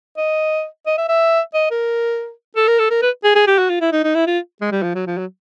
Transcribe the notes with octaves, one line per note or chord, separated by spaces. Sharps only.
D#5
D#5
E5
E5
D#5
A#4
A4
A#4
A4
A#4
B4
G#4
G#4
G4
F#4
F4
E4
D#4
D#4
E4
F4
G#3
G3
F3
F#3
F3
F#3